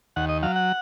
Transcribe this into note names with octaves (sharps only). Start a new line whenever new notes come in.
D#2 F#5
D#5
F#3 F5
F#5